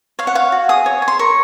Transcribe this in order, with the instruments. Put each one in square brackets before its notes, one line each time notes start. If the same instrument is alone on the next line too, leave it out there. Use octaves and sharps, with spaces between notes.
[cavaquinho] C#5 F5
F#5
C#5 F5
F#4
G#4 D#6
C#5
C#5
C6
A#4 C#6